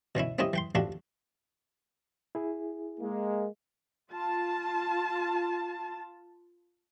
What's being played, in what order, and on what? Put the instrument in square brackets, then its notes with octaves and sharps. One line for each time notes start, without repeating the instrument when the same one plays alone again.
[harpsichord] B2 E3 C#4 E4
A#3 C4 C#4 E4 G4 D#5
E3 G5 C6
A1 C3 F3 D4 F#4 G4
[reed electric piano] E4 G#4
[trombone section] G#3 A#3
[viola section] F4 A5